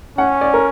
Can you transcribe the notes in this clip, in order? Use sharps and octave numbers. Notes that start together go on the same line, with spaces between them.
C#4 F#5
D5
A#4